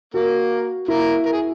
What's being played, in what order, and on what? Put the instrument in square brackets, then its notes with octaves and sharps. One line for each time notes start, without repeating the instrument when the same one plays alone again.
[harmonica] A#3 A#4 [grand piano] F#4
[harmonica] A#3 A#4 [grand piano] E4
[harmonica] A#4
G#4